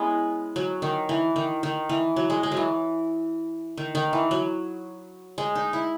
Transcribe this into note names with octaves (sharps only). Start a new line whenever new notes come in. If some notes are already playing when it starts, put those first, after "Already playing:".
Already playing: G#3 B3 C#4 E4
F#3
D#3
E3
D#3
D#3
E3
F#3
G#3
G#3
F#3
E3
D#3
D#3
E3
F#3
G#3
D#4
E4